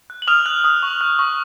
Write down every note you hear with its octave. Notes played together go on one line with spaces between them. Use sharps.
F#6
F#7
D#6 F6 F7
F#6
D#6
C#6
F#6
C#6